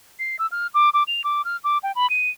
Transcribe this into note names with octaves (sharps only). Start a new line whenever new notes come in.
C7
E6
F6
D6
D6
F7
D6
F6
D6
G5
B5
D#7